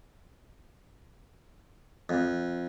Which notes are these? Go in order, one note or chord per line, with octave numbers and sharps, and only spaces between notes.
F2